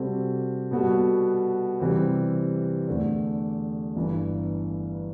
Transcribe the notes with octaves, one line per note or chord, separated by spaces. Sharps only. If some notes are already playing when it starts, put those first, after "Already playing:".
Already playing: C3 G3 C4 F#4 A4
B2 G3 B3 F#4 A4
C3 E3 G3 C4
E2 D3 A3 D4
G1 G2 E3